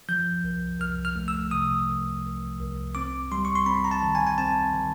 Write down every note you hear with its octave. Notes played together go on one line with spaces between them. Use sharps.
F3 G6
C2
C2 F6
F6
A3
E6
C3 D#6
C2
C2
C2
C4 D6
G3 C6
C#6
C6
C4 B5
A#5
A5
D#3
G#5
G#5
C4 A5
D#3